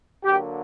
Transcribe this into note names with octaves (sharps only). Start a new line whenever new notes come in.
D3 F#3 A#3 G4